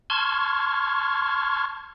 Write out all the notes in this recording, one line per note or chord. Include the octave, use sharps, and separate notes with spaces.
A5 C6 C#6 F6 G#6